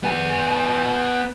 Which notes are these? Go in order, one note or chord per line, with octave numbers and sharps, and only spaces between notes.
B3 G#5